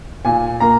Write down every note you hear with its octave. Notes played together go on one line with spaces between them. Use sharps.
A#2 G#5
A#3 A#5